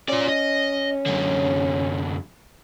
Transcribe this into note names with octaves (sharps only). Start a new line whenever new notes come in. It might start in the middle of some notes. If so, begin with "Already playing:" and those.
C#4 F4 D5
D#5
F#2 D3